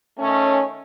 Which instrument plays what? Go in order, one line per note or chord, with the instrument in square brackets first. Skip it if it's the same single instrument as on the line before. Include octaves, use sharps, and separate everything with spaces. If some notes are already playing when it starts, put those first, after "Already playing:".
[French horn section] D#3 A3 C#4